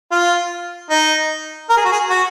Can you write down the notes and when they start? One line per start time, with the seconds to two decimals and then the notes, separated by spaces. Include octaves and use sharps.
0.11 F4
0.90 D#4
1.70 A#4
1.77 G#4
1.85 F#4
1.92 G#4
2.10 F#4